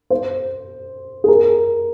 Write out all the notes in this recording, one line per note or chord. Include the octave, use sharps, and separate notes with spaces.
C5
G#4
A#4